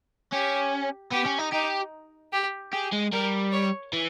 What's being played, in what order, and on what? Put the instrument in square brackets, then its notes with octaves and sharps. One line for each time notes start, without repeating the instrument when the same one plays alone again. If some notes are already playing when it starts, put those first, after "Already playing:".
[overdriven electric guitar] C#4 [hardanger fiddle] G4
[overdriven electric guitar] B3 [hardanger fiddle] G4
[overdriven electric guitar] C#4
D#4
[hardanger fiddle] D#4 [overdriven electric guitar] G4
[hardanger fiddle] G4
[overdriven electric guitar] G4 [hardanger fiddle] G#4
[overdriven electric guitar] G#3
[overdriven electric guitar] G3 [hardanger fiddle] A#4
[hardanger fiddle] C#5
[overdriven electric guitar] E3